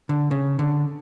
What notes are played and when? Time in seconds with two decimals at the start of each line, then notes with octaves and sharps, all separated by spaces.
0.09 D3
0.31 C#3
0.59 D3